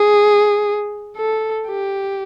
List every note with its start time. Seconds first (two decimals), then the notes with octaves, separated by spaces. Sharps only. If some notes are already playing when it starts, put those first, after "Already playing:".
Already playing: G#4
1.17 A4
1.67 G4